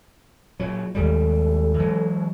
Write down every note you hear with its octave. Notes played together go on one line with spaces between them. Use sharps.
A#2 F#3
D#2 G#2 G3 A4
E3 F#3 G#3